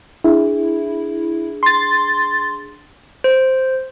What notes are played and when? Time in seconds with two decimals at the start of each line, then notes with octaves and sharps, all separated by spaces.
0.24 D4 E4 G#4
1.63 C6 A6
3.24 C5